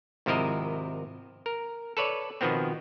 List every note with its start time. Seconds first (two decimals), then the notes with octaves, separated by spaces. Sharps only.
0.26 G#1 C3 F3 E4 A#4 D#5
1.46 A#4
1.97 A4 B4 C#5 D5
2.41 B2 D#3 F3 B3 C4